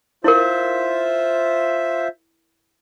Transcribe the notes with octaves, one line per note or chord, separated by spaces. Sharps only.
E4 F4 A#4 C5 E5